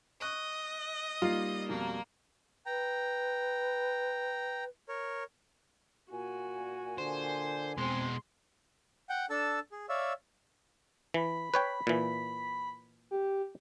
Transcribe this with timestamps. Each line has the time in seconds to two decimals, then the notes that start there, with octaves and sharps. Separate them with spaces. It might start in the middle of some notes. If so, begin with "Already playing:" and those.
0.20 D#5 C#6 F#6
1.22 G3 A#3 D#4 F4 C7
1.69 F2 B2 A#3
2.66 B4 G5 A#5
4.89 A#4 C#5
6.11 A#2 F#4 G#5
6.98 D3 C5
7.78 B2 G#3 C4 C6
9.09 F#5 G5
9.30 D4 A4 A5 E6
9.72 G#4
9.89 C#5 D5 E5 F5 E6
11.14 E3 B5
11.54 B4 C#5 G5
11.87 A#2 E3
13.11 G4